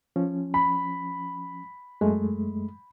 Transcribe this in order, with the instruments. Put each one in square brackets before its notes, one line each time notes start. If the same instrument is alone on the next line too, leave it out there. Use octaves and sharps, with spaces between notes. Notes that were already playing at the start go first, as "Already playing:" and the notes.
[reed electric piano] F3 C#4
[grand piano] B5
[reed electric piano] F#2 G#3 A3